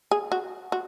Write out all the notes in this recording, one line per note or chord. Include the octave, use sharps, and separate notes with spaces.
G#4
F#4
F#4